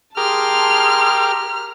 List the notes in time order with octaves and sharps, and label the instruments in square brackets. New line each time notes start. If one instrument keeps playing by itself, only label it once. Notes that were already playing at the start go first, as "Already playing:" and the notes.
[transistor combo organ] G4 A#4 [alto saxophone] G#4 [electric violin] A5 C6 [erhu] F6